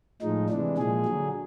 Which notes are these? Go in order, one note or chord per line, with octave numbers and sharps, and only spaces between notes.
A2 F3 G#3 D#4
C3 E3 G#3 D4
A#2 F3 G#3 G#4
D3 F#3